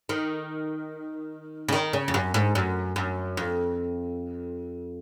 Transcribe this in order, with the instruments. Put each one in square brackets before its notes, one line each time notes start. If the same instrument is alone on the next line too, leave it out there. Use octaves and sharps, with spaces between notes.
[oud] D#3
C#3
D#3
C#3
F2
F#2
G#2
F#2
F#2
F2